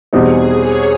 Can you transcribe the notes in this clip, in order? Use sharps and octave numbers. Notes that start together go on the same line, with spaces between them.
E2 B2 G3 C4 D#4 G#4
C#5